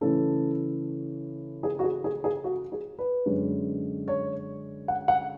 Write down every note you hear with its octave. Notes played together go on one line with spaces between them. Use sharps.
C#3 E3 A3 C#4 A4
G#4
F#4
G#4
G#4
G#4
F#4
G#4
B4
F#2 D3 G#3 C#4
C#5
F#5
F#5